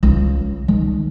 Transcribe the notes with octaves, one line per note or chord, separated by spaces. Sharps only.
C#2
D#3